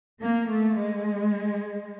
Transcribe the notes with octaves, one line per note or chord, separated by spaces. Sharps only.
A#3
A3
G#3